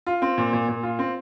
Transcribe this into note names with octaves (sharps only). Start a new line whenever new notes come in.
F4
C4
A#2
A#2
A#2
F4
C4